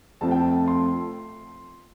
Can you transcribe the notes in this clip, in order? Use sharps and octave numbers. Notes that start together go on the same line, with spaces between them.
F2 F3 A3 C4 A5
G5
A5
C6